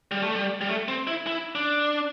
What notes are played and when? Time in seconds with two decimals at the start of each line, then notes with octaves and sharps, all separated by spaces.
0.11 G3
0.22 A3
0.34 G3
0.61 G3
0.69 A3
0.88 C4
1.07 E4
1.27 E4
1.55 D4